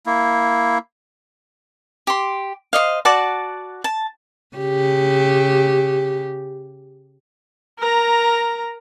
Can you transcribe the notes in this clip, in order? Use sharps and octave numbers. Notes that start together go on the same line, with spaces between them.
A#3 E4
G4 C6
C5 C#5 D#5 F5
F#4 D5 F#5 A5
A5
C#3 G4
A#4 A#5